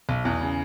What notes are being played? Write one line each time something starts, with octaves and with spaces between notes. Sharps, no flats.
B1
E2
C#3